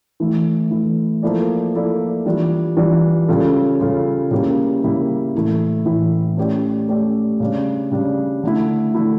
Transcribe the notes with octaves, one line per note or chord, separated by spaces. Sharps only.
E3 A3 E4
E3 A3 E4
F3 A#3 E4 A4 D5
F3 A#3 E4 A4 D5
E3 G3 D4 F4
E3 G3 D4 F4
C#3 G3 C#4 F4 A4
C#3 G3 C#4 F4 A4
C#3 G3 A#3 E4 G4
C#3 G3 A#3 E4 G4
A2 E3 A3 E4
A2 E3 A3 E4
A3 C#4 G4 D5
A3 C#4 G4 D5
C#3 G3 D4
C#3 G3 D4
D3 A3 E4
D3 A3 E4